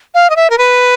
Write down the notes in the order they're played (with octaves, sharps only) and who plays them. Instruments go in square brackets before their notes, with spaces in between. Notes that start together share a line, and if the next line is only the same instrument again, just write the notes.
[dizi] F5
D#5
E5
A#4
B4